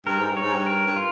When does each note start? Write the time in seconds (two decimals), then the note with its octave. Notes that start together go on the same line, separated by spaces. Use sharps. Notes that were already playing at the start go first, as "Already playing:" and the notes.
0.06 G2 A#4
0.19 G#2
0.30 G2
0.37 C#5
0.42 G#2
0.53 G2
0.66 A#4
0.87 G2
0.96 F4